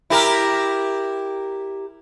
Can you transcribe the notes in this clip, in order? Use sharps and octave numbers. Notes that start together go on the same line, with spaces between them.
E4 G4 A#4